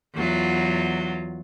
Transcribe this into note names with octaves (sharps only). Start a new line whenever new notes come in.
E2 F#3 F4